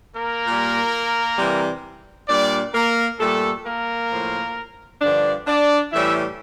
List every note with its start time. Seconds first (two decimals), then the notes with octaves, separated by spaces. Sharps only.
0.17 A#3 A#4
0.46 A#2 G3
1.38 C3 E3 G3
2.29 A#2 G3 D4 D5
2.74 A#3 A#4
3.20 A#2 G3 A3 A4
3.65 A#3 A#4
4.11 A2 F3
5.02 G2 D3 F3 D4 D5
5.47 D4 D5
5.92 A2 E3 G3 E4 E5